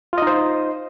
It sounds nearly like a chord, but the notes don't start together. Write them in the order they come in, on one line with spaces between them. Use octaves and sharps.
F4 D#5 D#4 C5